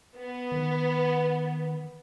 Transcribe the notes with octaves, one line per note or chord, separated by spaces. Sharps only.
B3
D#3